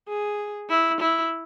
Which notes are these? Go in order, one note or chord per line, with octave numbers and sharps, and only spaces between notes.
G#4
E4
E4